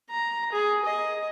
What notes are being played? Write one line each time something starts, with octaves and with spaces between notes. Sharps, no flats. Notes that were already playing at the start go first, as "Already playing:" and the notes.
A#5
G#4
D#5